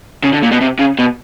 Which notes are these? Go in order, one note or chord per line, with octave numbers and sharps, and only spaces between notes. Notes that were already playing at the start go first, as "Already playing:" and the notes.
C#3
D3
A#2
B2
C3
C#3
B2